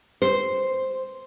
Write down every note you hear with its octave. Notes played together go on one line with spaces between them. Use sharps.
C5